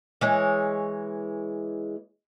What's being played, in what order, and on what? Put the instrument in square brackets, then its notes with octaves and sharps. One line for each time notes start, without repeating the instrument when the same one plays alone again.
[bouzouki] E3 G#3 C#5